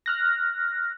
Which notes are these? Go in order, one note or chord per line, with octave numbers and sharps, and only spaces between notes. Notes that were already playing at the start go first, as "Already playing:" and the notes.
F6 F#6 A#6